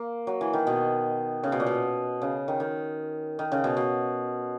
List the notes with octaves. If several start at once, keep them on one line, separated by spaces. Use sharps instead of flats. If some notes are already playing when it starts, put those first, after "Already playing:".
Already playing: A#3
F#3
E3
D#3
B2
C#3
B2
A#2
B2
C#3
D#3
D#3
D#3
C#3
B2
B2